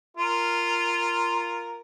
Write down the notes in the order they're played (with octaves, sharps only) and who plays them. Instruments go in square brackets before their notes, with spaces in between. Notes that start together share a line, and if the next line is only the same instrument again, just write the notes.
[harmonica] F4 A#4